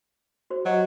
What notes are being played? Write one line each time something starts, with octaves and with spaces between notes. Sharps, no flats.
F#4 C5
F#3 G4 D#5